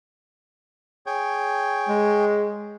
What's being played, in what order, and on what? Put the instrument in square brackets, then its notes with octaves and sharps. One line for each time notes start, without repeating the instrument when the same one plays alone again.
[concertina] G#4 C#5 G5
[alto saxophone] G#3